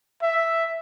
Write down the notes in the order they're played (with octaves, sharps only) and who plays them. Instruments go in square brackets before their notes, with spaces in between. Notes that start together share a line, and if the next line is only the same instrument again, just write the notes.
[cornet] E5